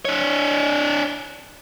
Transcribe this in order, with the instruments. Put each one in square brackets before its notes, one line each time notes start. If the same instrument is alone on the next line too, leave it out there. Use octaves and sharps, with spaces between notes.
[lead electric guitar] D4 C#5